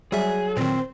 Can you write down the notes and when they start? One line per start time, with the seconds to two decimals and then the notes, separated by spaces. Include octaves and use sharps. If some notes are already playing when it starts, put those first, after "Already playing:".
0.12 F#3 G3 G#4 E5
0.57 A#2 D#3 C4 C5